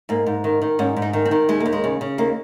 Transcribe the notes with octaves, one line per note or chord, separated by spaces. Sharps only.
G#2 A#3
G#2
D#3
D#3
G#2 C#4
G#2
D#4
D#3
C4
D#3
D#2 G#3
A#3
D#2
G#3
C#3
C#3
D#2 A#3